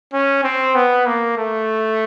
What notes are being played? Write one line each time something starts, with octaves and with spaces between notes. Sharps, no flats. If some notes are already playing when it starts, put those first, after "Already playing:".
C#4
C4
B3
A#3
A3